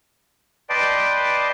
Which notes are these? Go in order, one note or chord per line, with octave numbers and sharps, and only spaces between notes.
B4 D5 D#5 G5 A5 C6